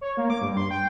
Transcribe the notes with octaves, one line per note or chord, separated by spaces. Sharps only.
C#5
A#3
D6
G2
C6
G5